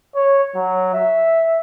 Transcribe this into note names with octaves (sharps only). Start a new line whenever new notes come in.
C#5
F#3
E5